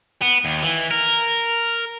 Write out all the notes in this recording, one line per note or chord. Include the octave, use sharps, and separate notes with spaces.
B3
D#2
E3
A#4